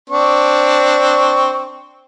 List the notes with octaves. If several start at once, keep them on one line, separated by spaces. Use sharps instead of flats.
C4 D4 C#6